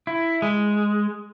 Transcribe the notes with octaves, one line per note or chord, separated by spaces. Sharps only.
E4
G#3